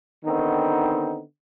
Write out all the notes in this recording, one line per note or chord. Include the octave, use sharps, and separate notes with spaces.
D3 D#3 B3 C4 D#4